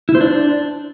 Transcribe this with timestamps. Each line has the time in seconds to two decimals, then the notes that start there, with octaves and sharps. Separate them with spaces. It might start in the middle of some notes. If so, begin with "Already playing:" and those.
0.09 E4
0.15 C5
0.21 D4